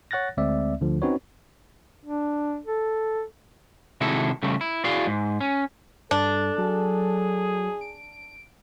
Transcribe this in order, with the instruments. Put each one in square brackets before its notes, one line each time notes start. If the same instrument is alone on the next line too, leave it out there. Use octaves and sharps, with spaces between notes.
[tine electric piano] C#5 F#5 F#6 A6 A#6
D2 G#3 C4 D5 E5
D2 D3 F3
C4 C#4 D#4 F#4 B4 C#5
[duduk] D4
A4
[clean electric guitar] C3 D#3 G#3 E4 F#4 A4
C#3 G3 A3
E4
E4 F#4 G#4 D5 F5
G#2
C#4
[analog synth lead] G2 [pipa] D4 [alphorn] A4
[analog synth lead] F#3 [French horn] G#4
[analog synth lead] D7